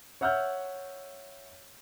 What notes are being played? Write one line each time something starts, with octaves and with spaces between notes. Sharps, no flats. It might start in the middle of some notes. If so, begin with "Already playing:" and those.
C#5 E5 F#5 E6 F6 G6